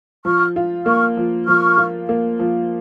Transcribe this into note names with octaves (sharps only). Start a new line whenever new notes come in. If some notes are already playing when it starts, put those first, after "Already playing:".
F3 C#6 F6
F4
A#3 C#6 F6
F3
F3 C#6 F6
F4
A#3
F3